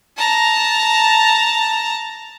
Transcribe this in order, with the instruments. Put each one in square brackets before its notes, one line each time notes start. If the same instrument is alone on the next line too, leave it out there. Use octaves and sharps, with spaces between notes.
[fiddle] A5 A#5